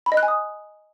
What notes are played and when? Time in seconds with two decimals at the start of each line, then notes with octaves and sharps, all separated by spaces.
0.06 B5
0.12 D#5
0.17 F#6
0.23 G#5
0.28 D#6